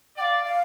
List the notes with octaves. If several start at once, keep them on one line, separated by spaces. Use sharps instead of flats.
D5 F5 G5
F5